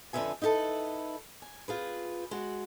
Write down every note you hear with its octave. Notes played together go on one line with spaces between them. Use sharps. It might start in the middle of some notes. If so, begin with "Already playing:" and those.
F2 D3 D#3 B4 E5 G#5
D#4 E4 G4 A4 B4
G#5
C4 F4 G#4 B4
G#3 F#4